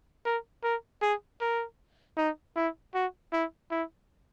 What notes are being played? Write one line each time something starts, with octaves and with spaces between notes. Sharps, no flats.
A#4
A#4
G#4
A#4
D#4
E4
F#4
E4
E4